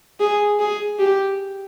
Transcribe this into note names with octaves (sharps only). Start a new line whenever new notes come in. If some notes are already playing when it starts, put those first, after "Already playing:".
G#4
G#4
G4